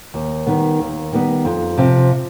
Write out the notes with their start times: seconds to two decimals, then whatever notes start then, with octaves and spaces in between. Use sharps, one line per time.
0.14 D#2
0.47 D#3 G3 B3
0.79 D#2
1.13 D#3 G3 B3
1.45 F2
1.78 C3 F3 C4